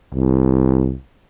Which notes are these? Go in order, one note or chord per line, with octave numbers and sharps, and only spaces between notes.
C2